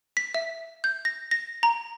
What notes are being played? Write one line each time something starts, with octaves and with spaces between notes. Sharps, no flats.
B6
E5
G6
A#6
A#6
A#5